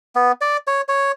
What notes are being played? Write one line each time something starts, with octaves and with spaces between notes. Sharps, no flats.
B3
D5
C#5
C#5